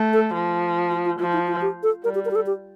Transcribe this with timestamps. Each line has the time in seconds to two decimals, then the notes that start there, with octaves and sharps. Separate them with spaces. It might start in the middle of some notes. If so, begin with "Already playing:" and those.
Already playing: A3
0.13 A4
0.34 F3
0.91 F4
1.05 F4
1.19 F3 F4
1.33 E4
1.48 F4
1.62 G4
1.83 A4
2.04 G3 A#4
2.15 G4
2.25 A#4
2.31 G4
2.35 A4
2.46 G4